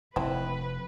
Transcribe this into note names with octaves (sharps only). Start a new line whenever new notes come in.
F1 C4 E4 B4